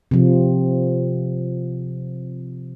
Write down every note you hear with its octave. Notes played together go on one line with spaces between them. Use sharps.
C3 F3